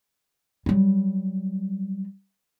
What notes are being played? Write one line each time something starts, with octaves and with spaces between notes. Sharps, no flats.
F#3 G3